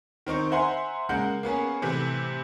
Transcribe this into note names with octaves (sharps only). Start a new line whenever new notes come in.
D#3 C4 D#4 C#6
C5 E5 F#5 G#5 A#5 C6
C#3 G#3 A#3 A#4 F#5 G6
A#3 B3 C#4 G#4
A2 C3 E3